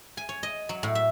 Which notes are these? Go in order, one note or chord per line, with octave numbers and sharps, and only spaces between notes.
G#5
C#5
D#5
F#3
A2
E5